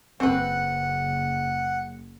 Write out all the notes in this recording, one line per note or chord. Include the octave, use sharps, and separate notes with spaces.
F#1 C4 B4 F#5